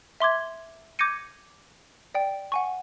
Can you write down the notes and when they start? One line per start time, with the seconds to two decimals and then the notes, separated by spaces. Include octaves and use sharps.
0.20 E5 C6 D6 G#6
0.99 D6 G6 G#6 A#6 C#7 D#7
2.15 D5 G5
2.52 F#5 G#5 C#6